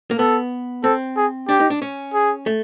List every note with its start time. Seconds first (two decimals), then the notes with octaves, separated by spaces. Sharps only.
0.11 A#3
0.18 B3 A4
0.84 C4 A4
1.17 G#4
1.48 D4 G4
1.60 D#4
1.70 D4
1.82 C#4
2.14 G#4
2.46 A3